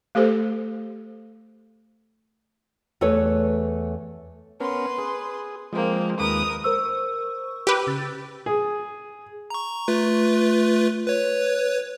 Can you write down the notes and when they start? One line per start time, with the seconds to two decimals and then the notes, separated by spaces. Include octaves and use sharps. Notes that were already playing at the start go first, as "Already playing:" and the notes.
0.15 A3 G4 A4 C5
3.01 E2 A3 A4 B4 C#5
4.60 B3 C#4 A#4 B4 C6
4.98 G#4
5.73 F3 G#3 A#3 C4
6.19 D#2 G#3 A#4 B4 D#6
6.64 A#4 C5 C#6 E6
7.67 G4 B4
7.87 C#3 E6 A6
8.46 G#4
9.50 A#5 C#6
9.88 A3 F4 B4
11.07 B4 C#5